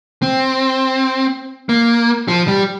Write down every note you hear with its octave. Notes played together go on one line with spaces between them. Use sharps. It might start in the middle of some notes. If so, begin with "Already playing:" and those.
C4
A#3
F3
G3